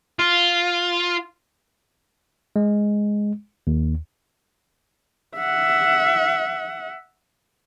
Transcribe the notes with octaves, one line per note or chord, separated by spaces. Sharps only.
F4
G#3
D#2
E5 F#5